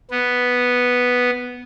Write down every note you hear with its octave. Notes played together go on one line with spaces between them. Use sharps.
B3